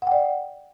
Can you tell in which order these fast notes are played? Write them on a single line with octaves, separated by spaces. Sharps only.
F#5 G5 D5